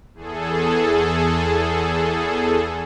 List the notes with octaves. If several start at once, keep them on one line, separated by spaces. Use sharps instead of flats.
E2 G#4 A4